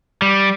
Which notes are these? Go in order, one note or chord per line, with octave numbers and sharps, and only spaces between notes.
G3